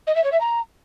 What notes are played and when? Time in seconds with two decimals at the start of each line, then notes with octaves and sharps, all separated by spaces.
0.07 D#5
0.15 E5
0.24 C#5
0.32 E5
0.41 A#5